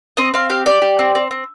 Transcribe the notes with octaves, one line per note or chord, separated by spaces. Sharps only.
C4 D#5
C4 F5
G4 F5
G4 D5
G4
C4
C4
C4